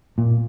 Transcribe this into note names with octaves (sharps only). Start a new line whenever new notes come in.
A#2